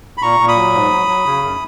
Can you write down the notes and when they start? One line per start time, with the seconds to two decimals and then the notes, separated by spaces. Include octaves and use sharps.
0.18 B5
0.22 A#2 A#5 C#6
0.40 A#2
0.48 B5 D#6
0.56 F#3
0.74 G#2
0.91 F#3
1.08 F#3
1.25 C#3
1.43 F#2